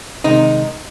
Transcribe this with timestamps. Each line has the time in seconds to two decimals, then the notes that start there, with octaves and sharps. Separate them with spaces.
0.24 C3 D#3 G#3 D#4